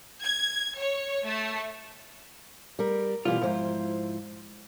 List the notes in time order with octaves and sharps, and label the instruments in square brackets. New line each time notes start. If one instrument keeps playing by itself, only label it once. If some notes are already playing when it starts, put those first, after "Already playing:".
[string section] G#6
C#5
A3
[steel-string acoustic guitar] G3 A#4
[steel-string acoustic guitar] B2 E3 G3 [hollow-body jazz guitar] F4
[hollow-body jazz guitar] D#2 G#2 [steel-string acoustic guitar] F3 E4 C5